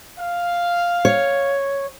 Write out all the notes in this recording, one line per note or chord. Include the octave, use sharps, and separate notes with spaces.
F5
C#5